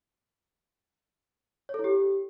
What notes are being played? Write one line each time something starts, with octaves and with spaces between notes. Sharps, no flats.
C#5
A4
E4
G4